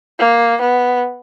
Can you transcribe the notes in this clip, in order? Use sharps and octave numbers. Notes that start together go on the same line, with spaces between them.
A#3
B3